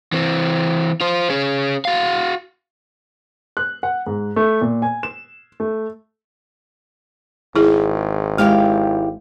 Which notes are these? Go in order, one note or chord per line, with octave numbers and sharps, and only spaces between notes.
E3 C4
F4 C5
C#4 G#4
F#4 F5
F#6
F#5
G#2
A3
A#2
G#5
E7
A3
G#1 E4 G#4
G#3 E4 G4 F5